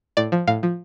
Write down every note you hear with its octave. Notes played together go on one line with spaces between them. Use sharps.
A2 D5
F3
A2 F5
F3